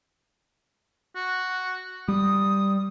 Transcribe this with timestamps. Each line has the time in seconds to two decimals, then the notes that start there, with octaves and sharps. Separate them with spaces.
1.16 F#4
2.08 G3 D#6